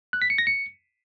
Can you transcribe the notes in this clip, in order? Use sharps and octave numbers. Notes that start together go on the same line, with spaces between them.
F#6
B6
C#7
A#6
C#7